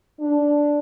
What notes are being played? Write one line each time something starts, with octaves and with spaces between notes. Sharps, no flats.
D4